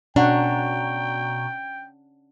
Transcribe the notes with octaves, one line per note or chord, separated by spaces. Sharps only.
B2 C#4 D4 F#5 G5 A#5 C#6